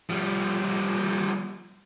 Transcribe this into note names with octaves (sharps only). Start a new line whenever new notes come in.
F3 G3